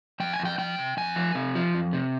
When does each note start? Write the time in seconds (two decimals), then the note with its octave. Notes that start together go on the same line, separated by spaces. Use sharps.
0.20 F2 G5
0.33 G#5
0.39 F2
0.45 G5
0.58 F3 G5
0.78 C3
0.97 F2 G#5
1.16 F3
1.35 C3
1.55 F3
1.75 F2
1.93 C3